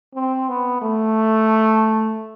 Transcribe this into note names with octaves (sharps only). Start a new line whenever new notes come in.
C4
B3
A3